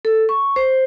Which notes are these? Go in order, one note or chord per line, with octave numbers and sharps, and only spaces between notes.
A4
C#6
C5